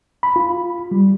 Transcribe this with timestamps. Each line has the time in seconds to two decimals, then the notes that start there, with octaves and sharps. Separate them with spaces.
0.23 B5
0.36 F4
0.91 G3